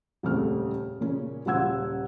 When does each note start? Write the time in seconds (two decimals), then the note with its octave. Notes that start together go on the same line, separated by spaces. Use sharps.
0.23 D#1 F2 C#3 A3 F6
1.01 A#2 C#3 C#4
1.46 D#1 C#3 F4 F#5 E6 G#6